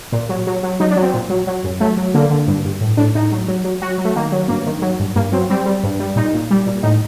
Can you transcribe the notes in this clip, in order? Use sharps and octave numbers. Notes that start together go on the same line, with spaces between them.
A#2
F#3
F#3
F#3
F#3 D#4
D4
F#3
C4
A#2
F#3
F#3
F#2
F#3 A3
F#3
D3 A#3
D3
G2
G2
A2
A2 D4
A2 D#4
F#3
F#3
F#3
F#3 F#4
F#3
A3
D#3 A#3
F#3
G2 A#3
D#3
F#3
G2
G2 A#3
F#3 C4
G3 C4
G3
G2
G3
A#2 D#4
A#2
G3
A#2
A2 D#4